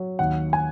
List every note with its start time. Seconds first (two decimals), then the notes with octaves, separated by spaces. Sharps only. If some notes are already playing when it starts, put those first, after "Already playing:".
Already playing: F#3
0.19 D#2 F#5
0.53 G#5